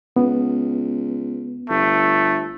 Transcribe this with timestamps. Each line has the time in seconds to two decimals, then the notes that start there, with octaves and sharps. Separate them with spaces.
0.16 C#2 B3
1.69 G1 A3